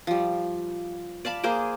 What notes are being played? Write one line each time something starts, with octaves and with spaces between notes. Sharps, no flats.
F3 G3
D5 F5 A5 B5
A#3 G#4 C5 D6